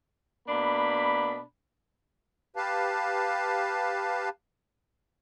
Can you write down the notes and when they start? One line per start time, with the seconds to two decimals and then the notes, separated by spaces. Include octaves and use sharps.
0.49 B2 A#3 D4 B5
2.56 G4 B4 F5 A5